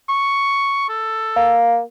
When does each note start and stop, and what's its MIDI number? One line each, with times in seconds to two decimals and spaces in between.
0.09 0.85 85
0.89 1.55 69
1.37 1.81 58